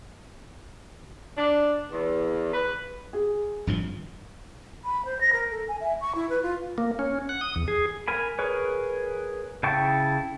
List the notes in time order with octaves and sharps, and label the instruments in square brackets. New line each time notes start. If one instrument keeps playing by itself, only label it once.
[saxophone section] D4
E2
B4
[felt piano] G#4
[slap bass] G#1 G2 F3
[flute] B5
C5
A#6
A#4
A4
G#5
E5
C#6
E4
B4
F4
[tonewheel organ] A#3
C#4
F#5
D#6
E2
G#4
[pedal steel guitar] A#4 G#5 B5
G#4 A#4 B4 C#5
C#3 E4 G5 A5 C#6